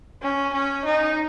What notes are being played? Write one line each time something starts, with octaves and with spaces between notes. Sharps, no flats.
C#4
C#4
D#4